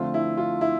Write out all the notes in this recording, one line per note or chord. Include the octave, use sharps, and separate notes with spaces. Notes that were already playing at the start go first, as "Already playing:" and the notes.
Already playing: F2 D3 A3 C4 F4
E4
F4
E4